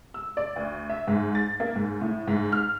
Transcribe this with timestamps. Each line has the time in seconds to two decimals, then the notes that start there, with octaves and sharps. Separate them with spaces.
0.14 E6
0.37 D5
0.56 D2
0.89 E5
1.07 G#2
1.35 A6
1.60 A#3
1.76 G#2
2.01 A2
2.27 G#2
2.52 F6